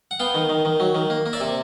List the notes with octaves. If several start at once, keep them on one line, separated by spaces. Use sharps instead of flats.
F#5
B3 F5 G5
D#3
D#3
D#3
F#3
D#3
A#3
A#3
D5 E5
C3